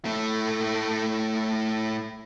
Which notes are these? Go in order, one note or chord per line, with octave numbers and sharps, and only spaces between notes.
A2 A3